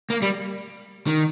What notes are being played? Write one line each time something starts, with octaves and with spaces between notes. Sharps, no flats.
A#3
G3
D#3